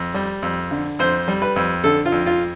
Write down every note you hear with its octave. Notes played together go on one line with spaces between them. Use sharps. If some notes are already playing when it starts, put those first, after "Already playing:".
Already playing: F2
G3
F2
D3
F2 C5
G3
B4
F2
D3 A4
F4
F2
F4